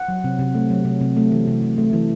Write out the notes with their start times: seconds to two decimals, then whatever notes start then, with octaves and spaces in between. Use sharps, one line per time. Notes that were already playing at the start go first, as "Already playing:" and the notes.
Already playing: F#5
0.09 F#3
0.24 C3
0.39 C3
0.55 A3
0.70 F#3
0.85 C3
1.01 C3
1.16 A3
1.32 E3
1.47 C3
1.62 C3
1.78 A3
1.93 E3